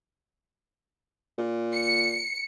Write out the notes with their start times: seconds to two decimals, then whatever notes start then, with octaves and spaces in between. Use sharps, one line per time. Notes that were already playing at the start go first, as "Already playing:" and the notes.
1.38 A#2
1.74 C#7